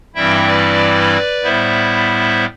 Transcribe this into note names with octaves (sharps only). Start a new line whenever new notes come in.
G2 E3 G3 C4 E4 E5 G5
B4 D5
A2 G3 B3 E4 C5 E5